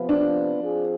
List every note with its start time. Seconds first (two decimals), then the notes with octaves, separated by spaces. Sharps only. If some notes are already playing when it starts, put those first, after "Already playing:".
Already playing: C3 F3 B3 F4 B4
0.09 D4
0.59 F3 C4 F4 G#4